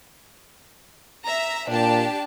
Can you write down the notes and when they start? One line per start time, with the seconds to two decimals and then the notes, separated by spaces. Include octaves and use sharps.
1.27 E5 A#5
1.69 A#2 D4 G4 A5